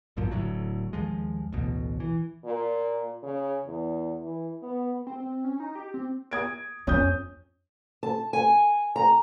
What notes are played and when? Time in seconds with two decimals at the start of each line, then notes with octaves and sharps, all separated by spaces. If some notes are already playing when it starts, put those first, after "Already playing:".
0.17 A1 F#2 A#2 F3
0.31 D1 D2 A2 F#3
0.93 D#2 F3 G#3
1.52 A1 D2 B2
2.00 E3
2.45 A#2
3.23 C#3
3.66 E2
4.21 E3
4.63 B3
5.07 C4
5.20 C4
5.45 C#4
5.60 D#4
5.75 G4
5.94 C4
6.31 D#6 G#6 D7
6.87 F2 C#4 D#6 G6
8.03 A5
8.33 G#5
8.96 A#5